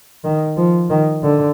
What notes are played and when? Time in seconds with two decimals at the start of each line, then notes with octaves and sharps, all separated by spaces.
0.24 D#3
0.57 F3
0.90 D#3
1.23 D3